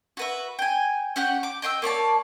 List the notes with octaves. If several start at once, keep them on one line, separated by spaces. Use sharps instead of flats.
F#4 B4 E5
G5 G#5
C#4 G4 F#5 G5
D6
D#5 G5 C6 E6
A#3 C#5 D5 A5